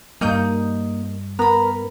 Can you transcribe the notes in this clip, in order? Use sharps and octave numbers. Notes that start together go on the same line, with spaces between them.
G2 G3 A#3 D#4 D#6 G6
B3 A#4 A#5 B5